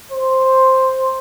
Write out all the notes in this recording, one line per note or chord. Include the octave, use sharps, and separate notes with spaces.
C5